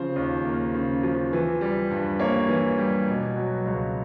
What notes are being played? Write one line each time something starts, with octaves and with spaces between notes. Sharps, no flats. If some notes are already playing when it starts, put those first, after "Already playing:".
Already playing: C#3 F3 C5
D#2
A#3
C#3
F3
E3
G3
G2
A#3 C#5
E3
G3
B2
F#3
C#2